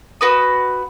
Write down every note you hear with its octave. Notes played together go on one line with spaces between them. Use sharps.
F#4 B4 D#6